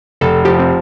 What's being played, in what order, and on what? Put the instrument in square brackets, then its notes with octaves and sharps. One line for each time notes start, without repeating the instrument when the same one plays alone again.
[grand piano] F1 [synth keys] A4
[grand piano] F3 [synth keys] G4
[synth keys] C4